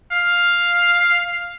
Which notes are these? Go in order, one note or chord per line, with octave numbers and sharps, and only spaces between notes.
F5